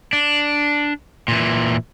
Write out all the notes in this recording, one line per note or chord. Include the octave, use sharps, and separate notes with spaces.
D4
A#2 E3